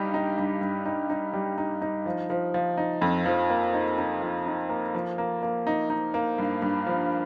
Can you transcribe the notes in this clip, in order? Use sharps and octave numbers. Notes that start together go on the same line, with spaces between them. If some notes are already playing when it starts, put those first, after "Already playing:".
Already playing: G2 G3 D#4 G4
D#4
G2
G2
D#4
D#4
G3
D#4
D#4
F3
F3
F3
D#4
F2
F3
A#3
D#4
D#4
F3
D#4
A#3
F3
A#3
A#3
D#4
D#4
A#3
G2
G2
F3